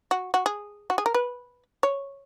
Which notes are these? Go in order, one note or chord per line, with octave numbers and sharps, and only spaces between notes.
F#4
F#4
G#4
F#4
G#4
A#4
B4
C#5